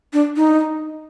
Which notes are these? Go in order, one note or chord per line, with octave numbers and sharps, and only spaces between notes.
D4
D#4